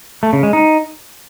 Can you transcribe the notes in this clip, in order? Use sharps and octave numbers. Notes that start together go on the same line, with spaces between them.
A3
C#3
G#3
D#4